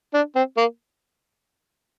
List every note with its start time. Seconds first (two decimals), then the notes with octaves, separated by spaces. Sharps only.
0.14 D4
0.35 C4
0.57 A#3